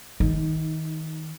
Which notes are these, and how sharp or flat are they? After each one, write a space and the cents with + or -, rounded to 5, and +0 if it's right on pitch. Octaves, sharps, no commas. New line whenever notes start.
D#3 +25 D#4 +0